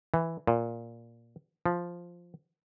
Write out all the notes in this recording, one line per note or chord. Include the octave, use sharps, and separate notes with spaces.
E3
A#2
F3